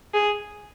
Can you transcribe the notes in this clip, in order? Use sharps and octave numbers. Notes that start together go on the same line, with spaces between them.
G#4